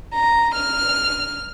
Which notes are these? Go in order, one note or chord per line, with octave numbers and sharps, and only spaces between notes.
A#5
F6